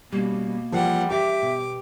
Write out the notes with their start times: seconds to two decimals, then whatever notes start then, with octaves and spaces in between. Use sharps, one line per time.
0.12 B2 G3 A#3 C#4
0.72 E3 F3 G3 G#4 A#4 C5 F#5
1.10 G4 E5 D6
1.42 B2